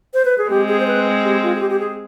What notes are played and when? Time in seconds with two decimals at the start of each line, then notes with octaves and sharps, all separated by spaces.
0.14 C5
0.25 B4
0.38 G#4
0.50 G#3 C4 G4
0.68 G#4
0.80 C5
0.87 B4
1.24 G4
1.43 F4
1.56 G#4
1.60 G4
1.71 G4
1.79 G#4